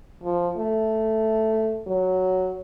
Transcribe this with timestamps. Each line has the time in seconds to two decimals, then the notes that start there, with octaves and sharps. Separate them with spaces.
0.23 F3
0.58 A3
1.87 F#3